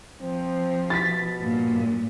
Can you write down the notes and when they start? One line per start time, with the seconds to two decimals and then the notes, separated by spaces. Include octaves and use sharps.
0.21 F3 C4
0.90 B2 A6 B6
1.40 G2 A#2